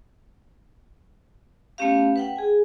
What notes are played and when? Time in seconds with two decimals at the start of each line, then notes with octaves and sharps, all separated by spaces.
1.78 A3 B3 C#4 G4 F5
2.16 B4 F#5 G5
2.36 G#4 G#5